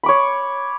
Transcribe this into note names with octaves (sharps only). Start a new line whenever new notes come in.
C#5 B5 D6